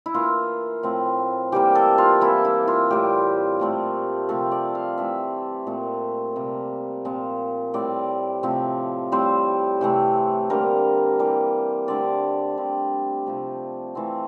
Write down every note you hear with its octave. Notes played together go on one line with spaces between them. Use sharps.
E4
E3 A#3 F4
A2 F3 C4
E3 G3 A#3 G4
A4
F4
E3 A#3 E4
E4
F4
A2 G3 C4 G4
A#2 A3 C4
C3 F3 A3 C4 A4
D5
F5
E3 A3 C4 E5
A#2 A3 C4
C3 G3 A#3
A#2 F3 C4
A2 G3 C4 D5
C3 F3 A3 C4
A2 G3 C4 C5
C3 E3 A3 C4
D3 G3 A#3 A#4
E3 G3 A#3
D3 A3 C4 D5
D3 G3 C4
C3 F3 A3
E3 A3 C4